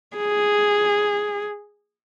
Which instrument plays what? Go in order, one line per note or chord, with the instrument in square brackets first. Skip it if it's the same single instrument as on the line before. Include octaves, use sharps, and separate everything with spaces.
[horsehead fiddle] G#4